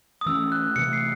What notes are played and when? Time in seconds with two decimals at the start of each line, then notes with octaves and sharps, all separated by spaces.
0.21 D#6
0.26 E3 A3 C#4 E6
0.52 F#6
0.76 C3 E3 A3 C#7
0.93 C7